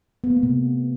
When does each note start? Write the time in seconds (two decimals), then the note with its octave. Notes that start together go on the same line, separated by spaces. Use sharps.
0.24 B3
0.30 A#3
0.37 A3
0.43 C3